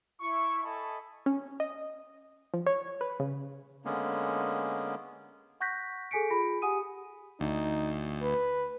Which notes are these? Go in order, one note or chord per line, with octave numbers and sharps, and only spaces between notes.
E4 C#6
A4 D#5 E5 G#5 A5 B5
C#4
D#5
F3
C#5
B4
C#3
D3 G#3 A#3 B3 C#4
F#5 C#6 F#6 G6 A#6 B6
G#4 A4 G#5 B6 C#7 D7
F4 G#4 B5 A#6
G4 F#5 G#5 D#6 D#7
D2 D#4
B4